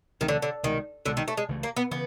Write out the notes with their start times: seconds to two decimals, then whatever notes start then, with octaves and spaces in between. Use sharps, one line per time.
0.21 D2 C3 D#3 E3 A3
0.28 D3
0.42 D3
0.63 C2 B2 D#3 G#3
1.06 C2 B2 D3 G#3
1.17 D#3
1.28 A3
1.37 G#3
1.48 C#2 C#3 E3 A3
1.63 A#3
1.77 B3
1.91 C#3 E3 B3